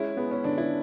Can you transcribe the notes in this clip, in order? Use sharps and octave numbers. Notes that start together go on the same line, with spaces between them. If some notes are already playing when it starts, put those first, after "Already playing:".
Already playing: G#3 C#4 E4
G#3 B3
C#4
D3 D4
E4